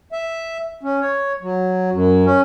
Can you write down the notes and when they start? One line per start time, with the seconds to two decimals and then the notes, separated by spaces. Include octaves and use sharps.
0.12 E5
0.83 C#4
1.01 C#5
1.42 F#3
1.93 F#2
2.26 C#4